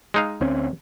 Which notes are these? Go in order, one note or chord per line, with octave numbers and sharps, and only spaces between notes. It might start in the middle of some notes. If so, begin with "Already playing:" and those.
G#3 D#4 F5
D2 C4 C#4